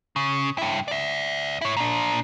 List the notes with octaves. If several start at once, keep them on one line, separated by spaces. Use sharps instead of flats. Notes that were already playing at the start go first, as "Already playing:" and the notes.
C#3
G2 E4
D5 E5
E4 C#5
A#2 D4